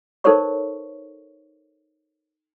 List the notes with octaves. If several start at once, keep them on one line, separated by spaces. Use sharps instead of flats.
D#4 A4 A#4 C5 C#5 C#6